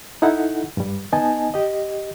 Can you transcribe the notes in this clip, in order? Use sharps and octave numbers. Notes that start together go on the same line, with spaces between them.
D#4 E4 A4 F#5
G2 G3
B3 D#4 D#5 G#5 A5
G4 D#5